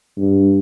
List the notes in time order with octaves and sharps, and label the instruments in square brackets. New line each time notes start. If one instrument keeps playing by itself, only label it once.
[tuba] G2